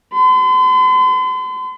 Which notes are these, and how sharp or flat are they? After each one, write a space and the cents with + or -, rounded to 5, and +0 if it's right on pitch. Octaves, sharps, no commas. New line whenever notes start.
C6 -45